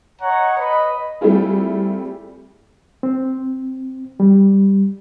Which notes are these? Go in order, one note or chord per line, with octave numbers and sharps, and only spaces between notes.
C#5 D#5 F#5 A#5
B4 D#5 B5
G3 A3 C4 E4 F4 G#4
C4
G3